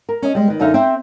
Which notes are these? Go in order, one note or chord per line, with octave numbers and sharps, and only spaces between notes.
A#4
C#4 D#5
G3 G#3
D#3 B4
F#2 D3 D#4 E5 F5
C4 E5 G5